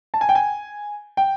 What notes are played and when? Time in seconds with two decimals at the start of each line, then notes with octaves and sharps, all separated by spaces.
0.14 A5
0.21 G#5
0.29 G5
0.35 G#5
1.17 G5